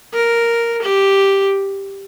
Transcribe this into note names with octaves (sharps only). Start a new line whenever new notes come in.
A#4
G4